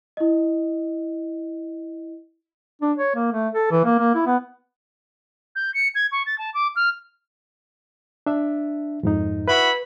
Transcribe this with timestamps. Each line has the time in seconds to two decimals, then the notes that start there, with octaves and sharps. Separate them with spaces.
0.17 E4 D#5
2.82 D4
2.98 C#5
3.15 A#3
3.32 A3
3.53 A4
3.71 E3
3.85 A#3
3.99 A#3
4.15 E4
4.27 B3
5.56 G6
5.74 C#7
5.95 G#6
6.12 C#6
6.26 A6
6.38 A5
6.54 D6
6.76 F6
8.26 D4 E5
9.03 F2 G#2 D#4
9.48 E4 F#4 B4 B5